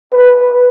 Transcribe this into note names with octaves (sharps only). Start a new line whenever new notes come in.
B4